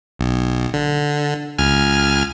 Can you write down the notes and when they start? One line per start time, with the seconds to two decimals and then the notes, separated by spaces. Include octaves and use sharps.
0.19 B1
0.73 D3
1.58 C#2 G#5 F6